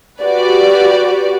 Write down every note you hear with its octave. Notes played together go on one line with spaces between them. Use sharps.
F#4 G4 B4 D5